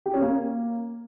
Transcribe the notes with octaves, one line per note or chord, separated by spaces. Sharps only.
G4
C#4
A#3